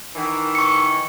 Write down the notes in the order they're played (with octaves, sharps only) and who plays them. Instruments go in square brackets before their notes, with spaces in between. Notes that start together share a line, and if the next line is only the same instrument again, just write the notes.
[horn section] D#3 E3
[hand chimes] C#6 C#7